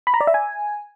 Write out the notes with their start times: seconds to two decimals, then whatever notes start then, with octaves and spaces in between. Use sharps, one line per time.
0.07 B5
0.14 A#5
0.21 D5
0.27 E5
0.34 G#5